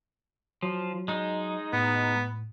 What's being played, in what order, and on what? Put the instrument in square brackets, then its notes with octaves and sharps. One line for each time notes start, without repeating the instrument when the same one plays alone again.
[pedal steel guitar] F3 [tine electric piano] F#3
[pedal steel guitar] G#3 D#4
[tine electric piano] A2 [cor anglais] B3